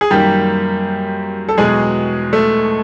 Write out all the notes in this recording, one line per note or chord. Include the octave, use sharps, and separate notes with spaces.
G#4
F#2 D#3 G3 A#3 G4
A4
E2 B2 F#3 G#3 G#4
A3 A4